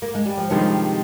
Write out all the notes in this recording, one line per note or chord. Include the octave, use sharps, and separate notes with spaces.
A#3
G#3
G3
F3
G2 C3 D#3 F3 G#3 D#4 G4